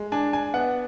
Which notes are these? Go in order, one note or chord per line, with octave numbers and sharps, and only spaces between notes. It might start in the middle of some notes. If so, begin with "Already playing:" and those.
Already playing: G#3
D4 G#5
G#5
B3 F#5